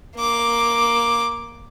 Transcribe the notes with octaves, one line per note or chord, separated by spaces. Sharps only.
A#3 D6